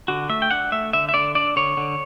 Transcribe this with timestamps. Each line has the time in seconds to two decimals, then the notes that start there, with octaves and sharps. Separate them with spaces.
0.08 D3 F#4
0.29 A3 E5
0.42 G5
0.51 D4 F#5
0.72 A3 E5
0.93 D3 E5
1.09 E5
1.14 D3 D5
1.35 D4 D5
1.56 D3 C#5
1.77 D3